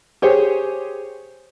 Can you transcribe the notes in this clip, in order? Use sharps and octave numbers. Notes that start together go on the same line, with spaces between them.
G4 G#4 C5 C#5